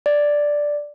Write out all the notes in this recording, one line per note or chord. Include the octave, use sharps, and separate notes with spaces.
D5